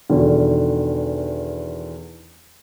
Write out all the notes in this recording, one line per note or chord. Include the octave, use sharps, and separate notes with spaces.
E2 B2 D3 D#3